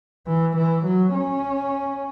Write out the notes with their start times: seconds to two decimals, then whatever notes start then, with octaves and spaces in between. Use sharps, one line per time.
0.27 E3
0.56 E3
0.85 F#3
1.14 C#4